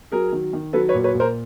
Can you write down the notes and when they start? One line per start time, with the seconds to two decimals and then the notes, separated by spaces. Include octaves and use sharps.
0.12 F#3 G#4 A#4
0.32 D#3
0.53 D#3
0.73 F#3 A4 B4
0.89 B4 C#5
0.94 A#2
1.04 B4 C#5
1.14 A#2
1.20 A#4 C5